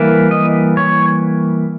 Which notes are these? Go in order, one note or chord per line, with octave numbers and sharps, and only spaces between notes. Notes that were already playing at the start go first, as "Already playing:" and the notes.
Already playing: E3 G3 A#3
D#5
C#5